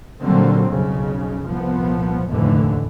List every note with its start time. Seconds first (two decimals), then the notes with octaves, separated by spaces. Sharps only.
0.22 A#2 D3 F#3 G3 A#3 C4
0.70 B1 F2 C#3
1.45 C2 A#2 F3 B3
2.28 F1 D#2 A2 D3 E3